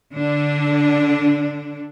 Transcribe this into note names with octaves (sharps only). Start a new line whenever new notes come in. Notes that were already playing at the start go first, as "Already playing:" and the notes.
D3 D4